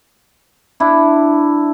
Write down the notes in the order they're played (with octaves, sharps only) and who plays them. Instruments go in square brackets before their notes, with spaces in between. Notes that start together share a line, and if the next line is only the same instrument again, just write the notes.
[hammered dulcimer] D4 E4